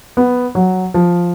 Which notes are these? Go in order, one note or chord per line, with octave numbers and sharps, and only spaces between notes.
B3
F#3
F3